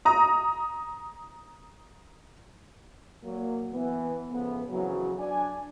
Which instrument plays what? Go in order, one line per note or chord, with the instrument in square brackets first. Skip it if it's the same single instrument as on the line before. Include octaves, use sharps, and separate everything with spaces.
[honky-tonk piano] A#5 D#6
[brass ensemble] A#2 F#3 A#3
E3 B3
A2 C#3 F3 B3
F2 C#3 E3 F#3
D4 D5 G#5